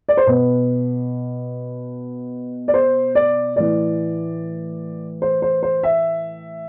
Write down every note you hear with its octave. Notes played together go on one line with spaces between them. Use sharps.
D5
C5
B2 B4
D5
C5
D5
A2 E3 D5
C5
C5
C5
E5